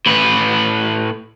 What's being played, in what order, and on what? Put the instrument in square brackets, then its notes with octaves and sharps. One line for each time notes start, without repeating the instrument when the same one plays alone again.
[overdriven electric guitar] A2 B4